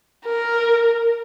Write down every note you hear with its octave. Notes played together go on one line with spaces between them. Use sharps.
A#4